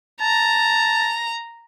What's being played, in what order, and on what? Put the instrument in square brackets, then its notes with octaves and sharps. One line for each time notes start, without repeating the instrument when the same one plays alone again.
[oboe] A5 [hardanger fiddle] A#5